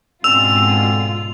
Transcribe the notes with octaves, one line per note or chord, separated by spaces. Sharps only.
G#2 B2 D3 C4 C#4 F4 E6 F7